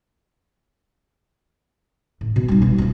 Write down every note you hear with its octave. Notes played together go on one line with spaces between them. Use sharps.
A2
B2
G3 D#4
C2 B2
F2 F4